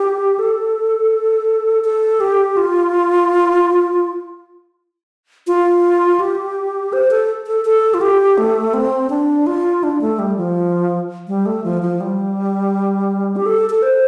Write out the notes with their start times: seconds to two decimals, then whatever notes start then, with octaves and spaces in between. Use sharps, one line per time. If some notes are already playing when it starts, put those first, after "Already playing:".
Already playing: G4
0.39 A4
1.84 A4
2.20 G4
2.57 F4
5.47 F4
6.20 G4
6.93 C5
7.11 A4
7.47 A4
7.65 A4
7.94 F4
8.01 G4
8.38 A3
8.74 C4
9.10 D4
9.47 F4
9.83 D4
10.01 A3
10.19 G3
10.37 F3
11.28 G3
11.46 A3
11.64 F3
11.82 F3
12.01 G3
13.36 G4
13.46 A4
13.70 A4
13.82 C5